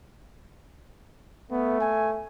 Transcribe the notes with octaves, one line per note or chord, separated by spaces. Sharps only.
A3 B3
G#5